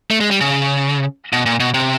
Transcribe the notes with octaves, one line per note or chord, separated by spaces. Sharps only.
A3
G#3
G3
C#3
B2
A#2
B2
C3